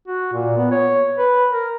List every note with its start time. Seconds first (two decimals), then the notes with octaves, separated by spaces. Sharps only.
0.08 F#4
0.33 A#2
0.57 B3
0.71 C#5
1.18 B4
1.52 A#4